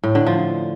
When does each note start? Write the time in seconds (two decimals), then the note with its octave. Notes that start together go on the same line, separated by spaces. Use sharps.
0.03 A2
0.15 D3
0.26 F3